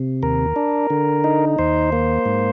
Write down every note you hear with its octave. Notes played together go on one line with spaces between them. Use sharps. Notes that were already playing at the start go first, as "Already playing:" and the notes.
Already playing: C3
D#2 A#4
D4
D3
D#4
D#2 C5
A#3
G#2